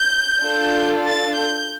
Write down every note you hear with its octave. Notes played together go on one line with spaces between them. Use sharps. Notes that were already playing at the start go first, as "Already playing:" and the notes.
Already playing: G6
D4 F4 A4
A6
G6